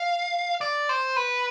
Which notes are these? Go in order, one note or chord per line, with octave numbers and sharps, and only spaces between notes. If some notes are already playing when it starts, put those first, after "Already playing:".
Already playing: F5
D5
C5
B4